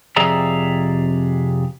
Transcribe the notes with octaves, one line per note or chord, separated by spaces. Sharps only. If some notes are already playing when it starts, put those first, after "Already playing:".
F2 C3 G#4 D5 E5 A#5